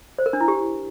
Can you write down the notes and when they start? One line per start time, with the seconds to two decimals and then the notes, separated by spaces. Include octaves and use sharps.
0.18 C5
0.26 A#4
0.33 D4
0.41 E4
0.48 G4